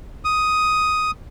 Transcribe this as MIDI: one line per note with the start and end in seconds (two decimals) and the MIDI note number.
0.25 1.11 87